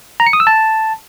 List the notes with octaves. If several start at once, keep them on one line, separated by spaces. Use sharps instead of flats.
A#5
C#7
D#6
E6
A5